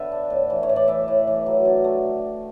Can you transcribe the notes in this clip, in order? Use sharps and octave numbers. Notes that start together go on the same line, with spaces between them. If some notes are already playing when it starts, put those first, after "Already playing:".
Already playing: D3 B4 E5
D4
A2
E3
C#5
A2
D5
E3 E5
A2
E3
F#3
D3
A3